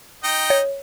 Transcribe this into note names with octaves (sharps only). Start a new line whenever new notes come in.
D#4 D#5 G5
C#5